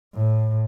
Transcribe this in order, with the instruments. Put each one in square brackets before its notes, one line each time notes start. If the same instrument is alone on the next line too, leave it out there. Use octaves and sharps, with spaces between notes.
[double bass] A2